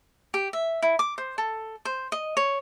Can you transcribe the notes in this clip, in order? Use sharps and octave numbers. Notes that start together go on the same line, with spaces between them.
G4
E5
E4
D6
C5
A4
C5
D#5
C#5